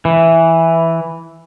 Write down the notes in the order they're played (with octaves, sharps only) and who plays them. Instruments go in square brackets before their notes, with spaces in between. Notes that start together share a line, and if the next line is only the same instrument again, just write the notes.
[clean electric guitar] E3